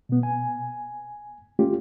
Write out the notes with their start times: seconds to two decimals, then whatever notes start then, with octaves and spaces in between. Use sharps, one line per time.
0.09 B2 B3
0.23 G#5
1.59 A3 C#4 F4 G4